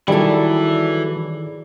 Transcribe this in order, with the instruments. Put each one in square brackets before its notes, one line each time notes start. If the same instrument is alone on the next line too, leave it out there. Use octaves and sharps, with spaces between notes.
[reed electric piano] D#3 G#4 D5 [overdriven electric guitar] E3 E4 [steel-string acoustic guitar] F#3 A4 [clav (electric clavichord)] G3